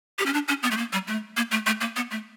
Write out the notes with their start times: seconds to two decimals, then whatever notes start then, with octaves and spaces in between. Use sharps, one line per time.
0.18 G4
0.26 C#4
0.33 D4
0.48 C#4
0.63 B3
0.71 A3
0.77 A#3
0.93 G3
1.07 A3
1.37 A#3
1.51 A3
1.66 A3
1.81 A#3
1.96 B3
2.11 A3